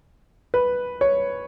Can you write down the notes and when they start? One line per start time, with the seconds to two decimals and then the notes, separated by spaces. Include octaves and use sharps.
0.54 B4
1.01 C#5